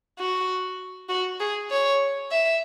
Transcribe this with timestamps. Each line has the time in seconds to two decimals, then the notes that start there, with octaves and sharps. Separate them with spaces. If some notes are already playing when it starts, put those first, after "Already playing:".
0.18 F#4
1.09 F#4
1.40 G#4
1.71 C#5
2.31 E5